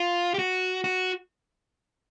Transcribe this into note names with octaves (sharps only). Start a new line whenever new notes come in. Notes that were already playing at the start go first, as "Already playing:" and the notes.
Already playing: F4
G4
F#4
F#4